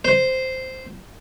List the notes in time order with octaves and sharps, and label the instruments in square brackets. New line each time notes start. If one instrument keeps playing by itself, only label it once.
[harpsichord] C5